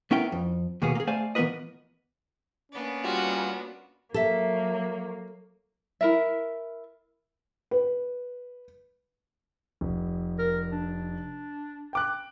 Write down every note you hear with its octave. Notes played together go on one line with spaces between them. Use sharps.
B3 C#4 E4 A#4 G5
F2
D#2 B2 A#3 B3 G#4
A#3 G#4
A3 C5 D5 F5 G#5
E3 B3 D4 A#4 B4 D#5
A#3 B3 C#4 D4
G3 F4 F#4
F#3 A#3 A4 E5
E4 A#4 E5
B4
F1
A#4
D4
G5 D6 F#6